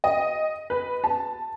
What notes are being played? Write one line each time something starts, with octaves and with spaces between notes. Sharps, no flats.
D#5
B4
A5